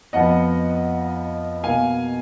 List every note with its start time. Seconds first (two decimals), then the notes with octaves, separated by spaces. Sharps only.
0.13 F2 F3 B3 D#5 F#5
1.63 B2 A#3 F5 G#5